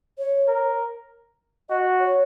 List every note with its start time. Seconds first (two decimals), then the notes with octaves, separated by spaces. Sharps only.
0.18 C#5
0.48 A#4
1.69 F#4 D#5
2.00 C#5